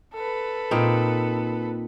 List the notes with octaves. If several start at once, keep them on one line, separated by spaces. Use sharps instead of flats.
A4 B4
A#2 C4 D#4